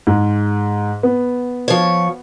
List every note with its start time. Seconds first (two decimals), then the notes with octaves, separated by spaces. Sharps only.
0.07 G#2
1.03 B3
1.68 F3 C#5